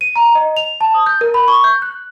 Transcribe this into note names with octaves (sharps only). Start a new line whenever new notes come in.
D#7
A#5
D#5
F7
A5
D#6
G6
A#4
B5
C#6
G6
F#6